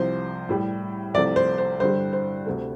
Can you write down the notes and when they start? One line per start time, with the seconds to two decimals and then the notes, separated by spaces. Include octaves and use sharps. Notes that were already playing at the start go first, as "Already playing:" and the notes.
Already playing: C2 C3 F3 C5
0.49 A2 G3
1.14 C2 C3 F3 A3 D5
1.36 C5
1.58 C5
1.80 G2 D3 G3 C5
2.13 C5
2.46 D2 C3 A3